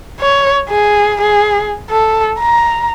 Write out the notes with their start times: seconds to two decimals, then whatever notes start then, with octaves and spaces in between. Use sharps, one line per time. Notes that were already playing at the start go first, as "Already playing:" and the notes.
0.20 C#5
0.69 G#4
1.22 G#4
1.90 A4
2.40 A#5